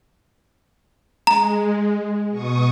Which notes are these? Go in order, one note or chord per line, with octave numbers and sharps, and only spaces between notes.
G#3 A#5
B2 C#6 D#6